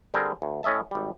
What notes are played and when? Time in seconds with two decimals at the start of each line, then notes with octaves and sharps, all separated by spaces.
0.14 D3 G3 C4 G#4 A#4 C5
0.42 D2
0.63 A2 C#4 D#5 E5 A5
0.91 G#1 G3